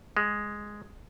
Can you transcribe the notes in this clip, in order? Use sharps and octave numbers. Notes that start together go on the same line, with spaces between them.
G#3